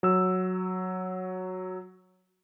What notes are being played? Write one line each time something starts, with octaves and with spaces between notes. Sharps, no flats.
F#3 E6